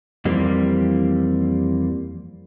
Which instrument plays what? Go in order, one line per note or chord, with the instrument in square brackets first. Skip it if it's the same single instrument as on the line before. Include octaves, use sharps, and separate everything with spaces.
[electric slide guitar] F2 E3 G3 A#3 C4